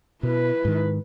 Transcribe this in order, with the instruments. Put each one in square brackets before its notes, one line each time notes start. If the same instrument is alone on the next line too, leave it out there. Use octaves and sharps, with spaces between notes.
[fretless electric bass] B2 [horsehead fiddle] E4 B4
[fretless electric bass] G#2 D#3